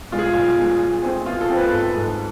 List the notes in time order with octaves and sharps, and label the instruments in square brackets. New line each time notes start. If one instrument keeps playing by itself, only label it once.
[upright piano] B2 G#3 [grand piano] F4
[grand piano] G#4
[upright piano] B1 [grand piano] F4
[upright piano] B2 G#3
B2
A3 C4 G#4 C5
[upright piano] B2 [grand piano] F4
[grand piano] A4
[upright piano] A3 C4 G#4 C5
[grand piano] B4
[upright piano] G#1 [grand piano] A4
[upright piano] G#2 G#3